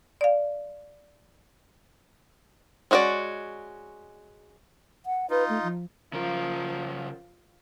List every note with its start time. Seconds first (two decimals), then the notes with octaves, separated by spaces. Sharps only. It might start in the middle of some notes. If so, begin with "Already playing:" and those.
0.21 D5 F5
2.91 G#3 C#4 F#4 C5 D5
5.06 F#5
5.30 D#4 F4 B4
5.49 A3
5.63 F3
6.13 C#3 F3 A#4